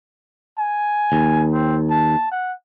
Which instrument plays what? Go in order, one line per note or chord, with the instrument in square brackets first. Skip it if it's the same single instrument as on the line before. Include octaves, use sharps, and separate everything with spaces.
[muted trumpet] G#5
[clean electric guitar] D#2
[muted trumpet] C4
A5
F#5